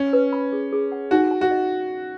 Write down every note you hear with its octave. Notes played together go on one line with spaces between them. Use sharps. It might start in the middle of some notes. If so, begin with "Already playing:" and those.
Already playing: C#4
B4
B5
G#4
G#4
F#5
D#4 F#4
G#5
F#4
D#5